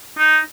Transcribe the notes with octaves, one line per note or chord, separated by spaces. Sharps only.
D#4